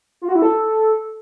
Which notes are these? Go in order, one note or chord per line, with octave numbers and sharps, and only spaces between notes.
F4
F#4
E4
A4